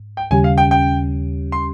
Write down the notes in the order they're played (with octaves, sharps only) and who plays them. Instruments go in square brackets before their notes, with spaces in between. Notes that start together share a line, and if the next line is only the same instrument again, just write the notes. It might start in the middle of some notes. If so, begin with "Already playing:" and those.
Already playing: [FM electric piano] G#2
[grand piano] G5
[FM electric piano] D#2 C#3 G3 C#4 G4 [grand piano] G#5
[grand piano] F5
G5
G5
C6